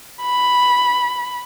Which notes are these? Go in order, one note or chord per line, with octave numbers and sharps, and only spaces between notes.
B5